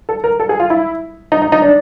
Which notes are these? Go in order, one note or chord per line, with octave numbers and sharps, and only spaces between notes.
A4
A#4
A4
G#4
F4
E4
D#4
D#4
D#4
D4